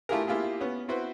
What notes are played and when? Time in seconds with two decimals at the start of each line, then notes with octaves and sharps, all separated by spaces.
0.09 A3 E4 F4 G4 G#4 A#4
0.27 A#3 E4 F4 G4 G#4
0.61 B3 C#4
0.88 C4 E4 F#4 B4 C5